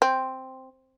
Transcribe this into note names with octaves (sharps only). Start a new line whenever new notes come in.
C4